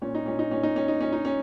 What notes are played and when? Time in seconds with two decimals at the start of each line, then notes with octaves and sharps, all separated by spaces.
0.02 A#2 C#4
0.15 D#4
0.26 A#2 C#4
0.39 D#4
0.51 A#2 C#4
0.63 D#4
0.76 A#2 C#4
0.88 D#4
1.00 A#2 C#4
1.12 D#4
1.25 C#4